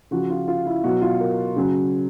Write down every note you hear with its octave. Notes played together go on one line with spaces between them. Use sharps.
C#3 F3 F#4
F4
F4
E4
B2 F#3 F#4
F4
A#4
C#3 F#3